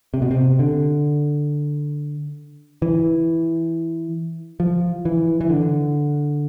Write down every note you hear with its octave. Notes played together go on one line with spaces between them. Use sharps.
C3
B2
C3
D3
E3
F3
E3
E3
D3